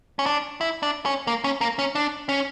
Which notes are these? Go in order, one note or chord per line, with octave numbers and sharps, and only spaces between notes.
C#4
D4
E4
D4
C#4
A#3
C#4
A#3
C#4
D4
C#4